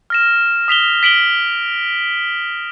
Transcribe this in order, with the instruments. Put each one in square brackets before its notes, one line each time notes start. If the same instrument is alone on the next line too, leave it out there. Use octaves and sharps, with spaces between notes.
[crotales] F6 A#6 E7
D#6 B6 F7 G7
B6 D7 F#7 G7